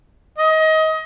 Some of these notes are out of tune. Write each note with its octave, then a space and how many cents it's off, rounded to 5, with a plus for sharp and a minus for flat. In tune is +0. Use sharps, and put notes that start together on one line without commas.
D#5 +25